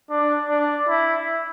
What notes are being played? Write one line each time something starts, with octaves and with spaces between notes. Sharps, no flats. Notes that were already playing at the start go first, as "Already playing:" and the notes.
D4
D4
E4